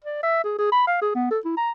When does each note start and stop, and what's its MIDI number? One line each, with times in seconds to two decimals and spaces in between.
0.04 0.19 74
0.23 0.43 76
0.44 0.58 68
0.58 0.70 68
0.72 0.82 83
0.87 1.00 77
1.02 1.13 68
1.15 1.28 59
1.31 1.39 69
1.45 1.52 64
1.57 1.71 82